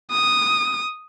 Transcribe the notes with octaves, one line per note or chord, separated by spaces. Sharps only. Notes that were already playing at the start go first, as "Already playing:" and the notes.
D#6